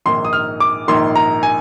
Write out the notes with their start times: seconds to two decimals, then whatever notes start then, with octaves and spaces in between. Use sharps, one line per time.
0.05 A#1 G#2 D#3 A#3 C6
0.25 D#6
0.33 F6
0.60 D6
0.88 A#1 G#2 D#3 A#3 C6
1.16 A#5
1.43 G#5